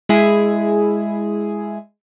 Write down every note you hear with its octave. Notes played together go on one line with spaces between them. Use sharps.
G#3 E4 G#4